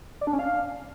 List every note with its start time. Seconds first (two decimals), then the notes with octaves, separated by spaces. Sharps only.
0.21 D5
0.27 D4
0.33 C#4
0.39 F5